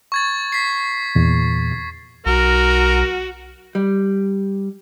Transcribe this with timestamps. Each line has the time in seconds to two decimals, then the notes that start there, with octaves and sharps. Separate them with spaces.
0.12 C#6 G#6 A6
0.52 B6 C7
1.15 E2 A#2
2.26 B1 F#4 A#4
3.75 G3